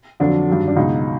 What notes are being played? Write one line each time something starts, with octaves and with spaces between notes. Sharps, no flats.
F2 D3 F#3 D4
G2 D#3 F#3
D4
C#2 B2 F#3 D#4